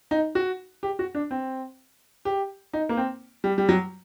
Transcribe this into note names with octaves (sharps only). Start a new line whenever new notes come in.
D#4
F#4
G4
F#4
D4
C4
G4
D#4
A#3
C4
G3
G3
F#3